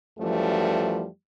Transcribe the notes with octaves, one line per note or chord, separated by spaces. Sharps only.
F#2 E3 F3 G3 A3